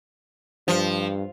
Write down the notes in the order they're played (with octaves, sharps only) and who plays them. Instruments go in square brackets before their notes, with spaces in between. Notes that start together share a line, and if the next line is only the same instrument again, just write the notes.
[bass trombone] G2 [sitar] F3